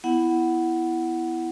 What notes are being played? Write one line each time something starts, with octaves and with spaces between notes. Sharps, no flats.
B3 E4 F#5